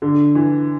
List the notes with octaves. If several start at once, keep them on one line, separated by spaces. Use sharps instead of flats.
D3
E3